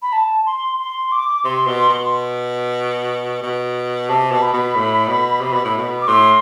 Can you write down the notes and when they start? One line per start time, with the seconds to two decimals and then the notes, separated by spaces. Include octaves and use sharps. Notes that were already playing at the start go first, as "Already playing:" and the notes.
0.02 B5
0.13 A5
0.46 C6
0.79 C6
1.12 D6
1.45 C3 C6
1.67 B2
1.89 B2
3.43 B2
4.09 C3 A5
4.32 B2
4.42 B5
4.54 B2
4.75 A2
5.08 B2
5.41 C3
5.53 B2
5.65 A2
5.78 B2
6.02 D6
6.08 A2 C6